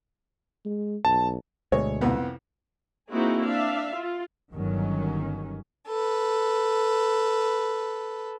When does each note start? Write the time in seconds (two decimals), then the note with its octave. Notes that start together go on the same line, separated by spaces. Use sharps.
0.65 G#3
1.05 B1 A5
1.72 D2 B2 G#3 C#5
2.01 C2 F2 B3
3.11 A#3 C4 D#4 E4 F#4 G#4
3.45 D4 E5 F5
3.94 F4
4.54 G1 D#3 F#3 C#4
5.88 A4 B4